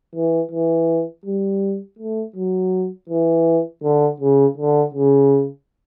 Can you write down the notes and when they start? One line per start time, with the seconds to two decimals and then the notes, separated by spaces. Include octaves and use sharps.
0.16 E3
0.52 E3
1.26 G3
1.99 A3
2.36 F#3
3.10 E3
3.84 D3
4.20 C#3
4.58 D3
4.95 C#3